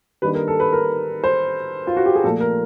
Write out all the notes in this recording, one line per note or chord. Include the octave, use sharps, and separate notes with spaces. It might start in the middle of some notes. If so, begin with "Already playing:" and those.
D#3 G3 A#3 D4 B4
A#4
A4
B4
A#4
C5
F4
F#4
G4
G#4
A#2 F3 A3 A4
A#4